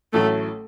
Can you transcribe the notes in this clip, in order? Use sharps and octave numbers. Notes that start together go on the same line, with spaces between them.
A1 A2 F#3 A3